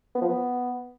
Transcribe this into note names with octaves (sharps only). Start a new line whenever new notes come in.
B3
F3
B3